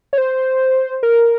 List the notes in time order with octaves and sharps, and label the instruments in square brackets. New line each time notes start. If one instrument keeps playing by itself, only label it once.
[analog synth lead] C#5
C5
A#4